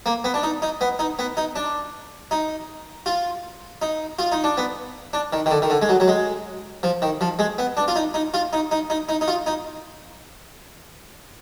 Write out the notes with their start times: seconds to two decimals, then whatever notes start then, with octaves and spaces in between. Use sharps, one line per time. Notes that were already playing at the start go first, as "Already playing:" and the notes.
0.06 A#3
0.24 B3
0.34 D4
0.43 D#4
0.62 D#4
0.81 B3
0.99 D#4
1.19 B3
1.37 D#4
1.56 D4
2.31 D#4
3.06 F4
3.82 D#4
4.19 F4
4.32 D#4
4.44 D4
4.57 B3
5.13 D4
5.33 D#3
5.46 D#3
5.51 D3
5.62 D#3
5.70 D3
5.82 G#3
5.89 F#3
6.00 F#3
6.08 G#3
6.83 F3
7.02 D#3
7.21 F3
7.39 G#3
7.58 B3
7.77 D4
7.88 F4
7.96 D#4
8.14 D#4
8.34 F4
8.53 D#4
8.71 D#4
8.90 D#4
9.09 D#4
9.21 D#4
9.28 F4
9.46 D#4